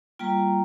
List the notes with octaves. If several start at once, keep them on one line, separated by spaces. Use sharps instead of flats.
G3 A#3 F4 G5 A#5